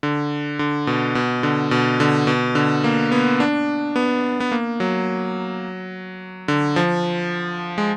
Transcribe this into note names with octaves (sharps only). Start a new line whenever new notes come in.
D3
D3
B2
B2
D3
B2
D3
B2
D3
A#3
B3
D4
B3
B3
A#3
F#3
D3
F3
G#3